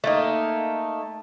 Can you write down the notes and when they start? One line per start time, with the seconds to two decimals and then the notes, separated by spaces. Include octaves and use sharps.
0.04 A3 A#3 D#4